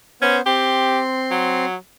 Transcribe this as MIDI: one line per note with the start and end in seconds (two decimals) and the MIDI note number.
0.22 0.41 59
0.22 0.37 61
0.22 0.41 72
0.46 1.65 60
0.46 1.00 67
0.46 1.65 84
1.31 1.76 54